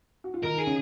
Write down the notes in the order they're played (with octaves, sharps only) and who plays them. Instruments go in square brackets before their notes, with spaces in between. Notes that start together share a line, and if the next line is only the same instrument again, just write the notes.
[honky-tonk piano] F#4
F4
[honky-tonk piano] D#3 D#4 [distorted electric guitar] A#4
[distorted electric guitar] G#4
[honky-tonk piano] C#3 C#4